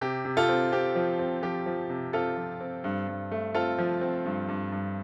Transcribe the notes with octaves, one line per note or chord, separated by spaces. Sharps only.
C3 G4
C3
F4 A4
C4
C4 G4
F3
C4
F3 G4
F3
C3
C4 F4 A4
F3
C4
G2
G2
A3
C4 F4 A4
F3
C4
G2
G2
G2